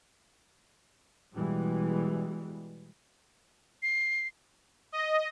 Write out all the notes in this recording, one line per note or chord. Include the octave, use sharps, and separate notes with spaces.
B2 E3 G3 G#3
C7
D#5